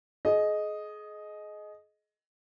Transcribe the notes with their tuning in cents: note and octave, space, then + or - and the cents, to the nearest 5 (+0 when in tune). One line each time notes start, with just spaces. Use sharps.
G#4 +35 D#5 +0